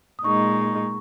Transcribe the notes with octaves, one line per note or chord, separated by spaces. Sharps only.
D#6
A#2 G#3 D#4 C#6